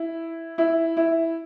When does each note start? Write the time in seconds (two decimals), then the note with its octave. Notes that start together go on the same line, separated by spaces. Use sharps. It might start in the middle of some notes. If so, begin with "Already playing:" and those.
Already playing: E4
0.58 E4
0.97 E4